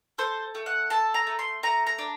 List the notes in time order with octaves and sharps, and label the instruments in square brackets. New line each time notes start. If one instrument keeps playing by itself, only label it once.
[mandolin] A4 C5
A3
F#5
A4 A5
A#5
A3
C6
A3 A#5
A#5
D4